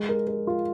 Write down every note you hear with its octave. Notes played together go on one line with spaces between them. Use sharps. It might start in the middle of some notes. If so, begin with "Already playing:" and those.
Already playing: G#3
A#4
A#4
F4